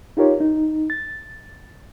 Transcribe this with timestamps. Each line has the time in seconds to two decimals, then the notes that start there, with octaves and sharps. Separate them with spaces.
0.17 D#4 F4 G4 A#4 C#5
0.40 D#4
0.90 A6